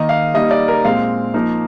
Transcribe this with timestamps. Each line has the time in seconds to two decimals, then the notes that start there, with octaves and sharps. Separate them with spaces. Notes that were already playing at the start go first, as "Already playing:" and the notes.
Already playing: D#3 A#3 D#4 D#5
0.09 F5
0.34 G3 A#3 D#4 D#5
0.51 D5
0.68 A#4
0.84 A#2 G#3 C4 F5
1.34 F3 A#3 D#4